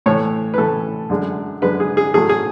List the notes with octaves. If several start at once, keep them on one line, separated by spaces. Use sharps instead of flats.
A2 E3 A3 C#5
B4
A2 E3 A3 A4
F#2 D3 G#3
F#2 D3 G#3 B4
G#4
G#4
A2 F#3 A3 G#4
G#4